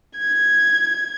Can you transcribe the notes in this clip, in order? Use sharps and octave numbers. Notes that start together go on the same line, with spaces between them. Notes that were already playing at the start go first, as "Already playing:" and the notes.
G#6